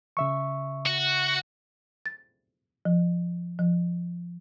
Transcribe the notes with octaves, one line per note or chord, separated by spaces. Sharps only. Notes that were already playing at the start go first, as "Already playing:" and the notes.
C#3 E5 C#6
F#4
A6
F3
F3